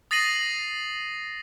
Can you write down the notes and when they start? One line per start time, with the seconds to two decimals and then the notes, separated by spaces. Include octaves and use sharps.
0.11 D#6 A6 A#6 C7 D#7 F#7